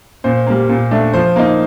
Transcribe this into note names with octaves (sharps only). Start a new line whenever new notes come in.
A#2 C5
G3 A#3
A#2
A3 D4
F3 C5
A#3 D#4